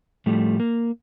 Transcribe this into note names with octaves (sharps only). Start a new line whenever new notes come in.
A2 F3 G3 A3
A#3